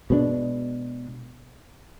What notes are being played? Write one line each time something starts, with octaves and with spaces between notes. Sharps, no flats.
B2 G#3 B3 D4